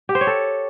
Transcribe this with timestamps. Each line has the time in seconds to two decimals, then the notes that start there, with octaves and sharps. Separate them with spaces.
0.09 G4
0.15 C5
0.21 C#5
0.27 A4